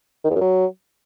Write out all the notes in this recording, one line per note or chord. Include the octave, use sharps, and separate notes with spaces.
D#3
E2
F#2
F#3